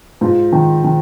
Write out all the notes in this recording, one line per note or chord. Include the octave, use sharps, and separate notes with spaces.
G#2 F4
D#3
D#3